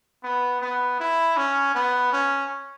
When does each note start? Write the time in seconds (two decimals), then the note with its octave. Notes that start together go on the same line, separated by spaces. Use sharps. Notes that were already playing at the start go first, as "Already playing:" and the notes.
0.23 B3
0.61 B3
0.99 E4
1.37 C#4
1.74 B3
2.12 C#4